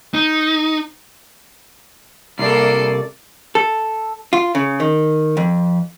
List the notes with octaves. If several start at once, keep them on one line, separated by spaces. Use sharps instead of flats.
D#4
C2 A#3 A4 D5 C7
A4
F4
C#3
D#3
F2